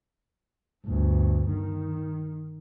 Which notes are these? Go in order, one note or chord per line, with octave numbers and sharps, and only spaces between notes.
G1 D2
D#3